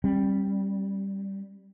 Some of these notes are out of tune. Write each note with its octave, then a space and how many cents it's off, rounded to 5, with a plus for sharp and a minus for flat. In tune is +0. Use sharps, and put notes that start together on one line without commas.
G3 +0 C4 +45